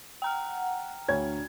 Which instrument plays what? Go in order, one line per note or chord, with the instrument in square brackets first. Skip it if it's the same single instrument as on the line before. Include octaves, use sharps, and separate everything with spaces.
[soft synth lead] F#5 [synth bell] G5 A#5 F6
[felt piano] D2 C#5 G#6 [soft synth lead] D4